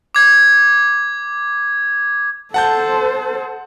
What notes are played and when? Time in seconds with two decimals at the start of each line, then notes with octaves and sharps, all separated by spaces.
0.15 D6 G#6
2.54 A4 C5 F#5 A5 G6